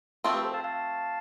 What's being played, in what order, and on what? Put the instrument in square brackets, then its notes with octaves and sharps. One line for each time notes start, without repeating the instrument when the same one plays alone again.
[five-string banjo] F3 A3 C4
[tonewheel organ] G4 B4
A4 C5
F5 A5
F5 A5